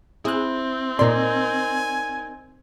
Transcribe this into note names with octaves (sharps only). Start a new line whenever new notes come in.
C4 E4 G#4 F#6
A#2 D#4 A#4 D5 G#5 C6